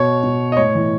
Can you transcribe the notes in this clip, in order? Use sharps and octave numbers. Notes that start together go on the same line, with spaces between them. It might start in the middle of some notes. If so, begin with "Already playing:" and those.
Already playing: B2 C#5
B2
D#5
A2 C#5
E3